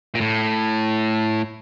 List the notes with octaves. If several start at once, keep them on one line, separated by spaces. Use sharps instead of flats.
A#2
A2